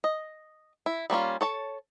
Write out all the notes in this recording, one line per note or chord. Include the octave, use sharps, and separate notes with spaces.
D#5
E4
G3 A#3 C#4 F4
A4 C#5 A5